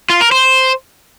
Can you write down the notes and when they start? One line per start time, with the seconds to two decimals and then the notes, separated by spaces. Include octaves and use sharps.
0.10 F4
0.21 A#4
0.32 C5